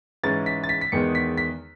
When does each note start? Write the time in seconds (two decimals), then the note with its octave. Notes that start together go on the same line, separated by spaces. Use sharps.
0.23 G#2 E3 G#3 C#4 A6
0.46 B6
0.64 A6
0.69 B6
0.81 B6
0.92 E2 D#3 G#3 B3 C#7
1.15 B6
1.37 B6